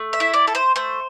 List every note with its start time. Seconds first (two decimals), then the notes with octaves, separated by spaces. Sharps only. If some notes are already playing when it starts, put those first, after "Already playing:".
Already playing: A3
0.13 E5
0.20 E4
0.34 D5
0.47 A4
0.55 C5
0.76 A3 C5